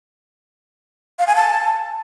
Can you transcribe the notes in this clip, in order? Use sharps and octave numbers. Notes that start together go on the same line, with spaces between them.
F5
G#5
A5